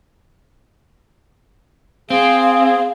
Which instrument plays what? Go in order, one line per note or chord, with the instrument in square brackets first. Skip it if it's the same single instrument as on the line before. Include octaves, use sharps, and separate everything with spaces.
[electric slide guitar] C4 [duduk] G#4 [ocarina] F5